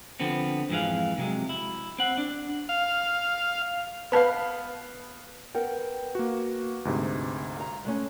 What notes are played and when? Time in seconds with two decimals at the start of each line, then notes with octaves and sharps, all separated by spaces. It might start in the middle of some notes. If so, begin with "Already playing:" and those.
0.20 D3 F3 B3 C4
0.70 F2 G#2 E3 G#4 F5
1.18 C3 F#3 G#3
1.49 E4
1.99 C4 F#5
2.18 D4
2.69 F5
4.12 B3 B4 F5 A5 B5
5.55 B3 A#4 F#5 G5
6.15 A#3 F#4
6.85 D2 G#2 C3
7.56 F5 A#5
7.85 G#3 A3 C#4